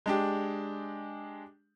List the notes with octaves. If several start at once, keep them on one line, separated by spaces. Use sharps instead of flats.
G#3 D4 G4